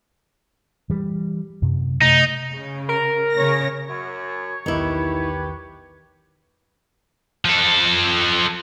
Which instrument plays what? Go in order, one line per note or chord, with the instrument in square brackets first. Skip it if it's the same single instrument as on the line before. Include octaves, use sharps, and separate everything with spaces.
[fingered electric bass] E3 G3
F#2 C3
[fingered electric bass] C3 A3 [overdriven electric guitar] D#4
[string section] C#3
[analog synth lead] A#4
[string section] C#3 C#5 A#6
[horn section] F#2 [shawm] C#5
[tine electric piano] B1 E2 D#3 [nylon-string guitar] D#4 E4 [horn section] G4 B4
[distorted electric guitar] F3 A4